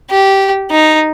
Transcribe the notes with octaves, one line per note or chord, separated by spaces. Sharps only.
G4
D#4